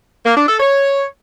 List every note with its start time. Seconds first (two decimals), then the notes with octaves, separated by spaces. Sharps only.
0.25 A#3
0.37 D4
0.48 A4
0.60 C#5